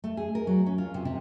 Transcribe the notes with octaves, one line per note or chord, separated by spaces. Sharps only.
A3
G#4
A#4
F#3
C#4
F4
C3
C3